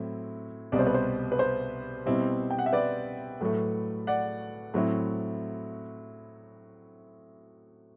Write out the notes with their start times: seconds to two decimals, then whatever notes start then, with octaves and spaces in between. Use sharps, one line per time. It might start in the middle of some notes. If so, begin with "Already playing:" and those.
Already playing: A2 F#3 C4 E4
0.72 C2 B2 G3 D5
0.79 C5
0.87 B4
0.94 C5
1.32 B4
1.39 C5
2.06 B2 G3 C4 E4
2.51 G5
2.59 F#5
2.66 E5
2.73 B4 D5
3.41 A2 F#3 A3
4.07 D5 F#5
4.74 A2 F#3 C4 E4